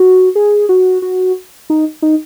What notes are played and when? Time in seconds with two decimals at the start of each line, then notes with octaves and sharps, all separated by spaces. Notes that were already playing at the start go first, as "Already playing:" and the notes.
Already playing: F#4
0.35 G#4
0.69 F#4
1.02 F#4
1.70 D#4
2.02 D#4